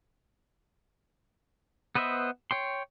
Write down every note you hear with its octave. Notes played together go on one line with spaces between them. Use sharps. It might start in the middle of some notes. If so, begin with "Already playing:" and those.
B3 B4 C5 D#5 E5
C#5 G5 C6